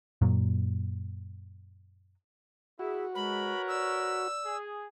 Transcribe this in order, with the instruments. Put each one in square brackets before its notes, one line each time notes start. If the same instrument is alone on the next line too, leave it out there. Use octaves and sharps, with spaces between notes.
[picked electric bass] F#2 A#2 F#3
[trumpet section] E4 [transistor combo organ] F#4 [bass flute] G#4
[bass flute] G#3 [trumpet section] A#4 B4 C#5 [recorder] B5
[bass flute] D5 [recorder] E6
[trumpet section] G#4